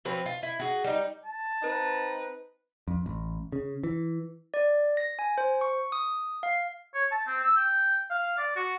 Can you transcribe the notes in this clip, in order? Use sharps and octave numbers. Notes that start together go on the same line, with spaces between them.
F3 F#3 C4 B4
F4
E4
F#4 G#4
G3 D#4
A5
C4 D#4 B4
F2
A1
C#3
E3
D5
A#6
G#5
C5
C#6
D#6
F5
C#5
A5
C4
E6
G5
F5
D5
F#4